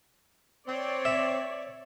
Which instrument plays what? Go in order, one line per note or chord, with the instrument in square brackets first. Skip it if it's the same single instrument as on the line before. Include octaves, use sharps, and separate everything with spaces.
[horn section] C4 [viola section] C#5 D5
[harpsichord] E5